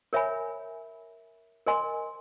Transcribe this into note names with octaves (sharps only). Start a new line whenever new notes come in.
A#4 C#5 E5 G#5 B5
A#4 D#5 G#5 C6